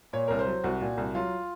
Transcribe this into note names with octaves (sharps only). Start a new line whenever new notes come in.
A#2 C#5
C2 A#4
C5
F#3
C2 F#4
A#2
C2
F#3 F4